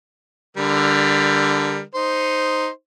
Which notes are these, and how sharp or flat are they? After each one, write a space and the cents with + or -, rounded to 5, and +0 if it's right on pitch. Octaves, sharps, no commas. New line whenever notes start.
D3 +0 G3 +20 A#4 +5
D#4 +0 C5 +0